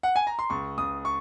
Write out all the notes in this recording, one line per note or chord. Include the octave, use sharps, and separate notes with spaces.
F#5
G#5
A#5
C6
C#2 C#6
C#2 D#6
C#6